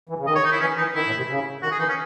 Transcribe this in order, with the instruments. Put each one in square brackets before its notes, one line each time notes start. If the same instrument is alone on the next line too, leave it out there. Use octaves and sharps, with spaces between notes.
[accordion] E3
C#3
[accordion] D#3 [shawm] D#5
[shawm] C#5
D#4
E4
[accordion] E3 [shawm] C#4
[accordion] E3 [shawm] D#4
[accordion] D#3 [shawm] E4
[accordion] A2
C3
C#3
[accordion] D#3 [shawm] F#4
[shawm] G#4
[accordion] E3 [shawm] D#4
[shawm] C#4